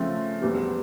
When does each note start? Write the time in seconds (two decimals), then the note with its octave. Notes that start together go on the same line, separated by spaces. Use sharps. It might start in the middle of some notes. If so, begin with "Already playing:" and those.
Already playing: C#3 F3 A3 C4
0.42 E2 B2 G3 C4